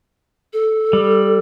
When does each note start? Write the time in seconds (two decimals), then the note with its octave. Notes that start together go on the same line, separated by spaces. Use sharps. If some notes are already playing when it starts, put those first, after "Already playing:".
0.53 A4
0.93 G3